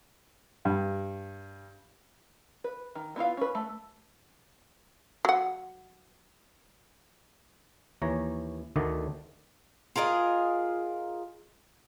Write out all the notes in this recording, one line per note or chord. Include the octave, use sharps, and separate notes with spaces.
G2
B4
D#3
B3 E4 F4 F5
C#4 B4
A3
F#3 F#5
D#2 E3 C#5 A#5
D2 D3 D#3 A3 D5 D#5
F4 G#4 A#4 D#5